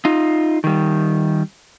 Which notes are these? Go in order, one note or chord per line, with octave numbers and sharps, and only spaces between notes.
D#4 F4
D#3 G3